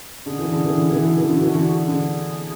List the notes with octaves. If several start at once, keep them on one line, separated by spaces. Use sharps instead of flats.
D3 G#4
E3
D3
E3
D3
E3
D3
E3
D3 F#4
E3
D3 F#4
G#4
D3 G#4